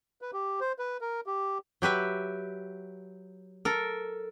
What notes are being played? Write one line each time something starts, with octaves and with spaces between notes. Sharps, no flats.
B4
G4
C5
B4
A#4
G4
F#3 G4 B4 E5
A4 A#4